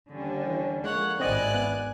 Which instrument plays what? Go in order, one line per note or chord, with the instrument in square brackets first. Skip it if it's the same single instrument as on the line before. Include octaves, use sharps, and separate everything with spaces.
[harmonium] D#2 G3 C#4 [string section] D3
[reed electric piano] E3
[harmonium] F2 A#3 [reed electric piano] G#3 [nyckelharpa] C#5 F#5
[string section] G#1 D#2 F#6 [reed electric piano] C4 D#5 [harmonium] E4 [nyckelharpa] D5 G#5
[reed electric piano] B3